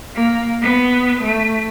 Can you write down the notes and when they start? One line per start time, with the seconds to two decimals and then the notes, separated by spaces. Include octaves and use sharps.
0.15 A#3
0.62 B3
1.23 A3